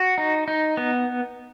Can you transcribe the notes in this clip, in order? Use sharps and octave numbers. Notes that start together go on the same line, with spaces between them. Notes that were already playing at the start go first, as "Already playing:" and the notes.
Already playing: F#4
D#4
D#4
B3